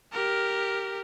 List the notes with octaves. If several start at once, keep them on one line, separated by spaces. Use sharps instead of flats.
G4 A#4